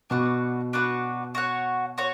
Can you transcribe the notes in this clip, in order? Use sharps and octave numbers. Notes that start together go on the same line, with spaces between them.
B2 D4 F#4 B4 F#5
D4 F#4 B4 F#5
F#4 C#5 F#5
F#4 C#5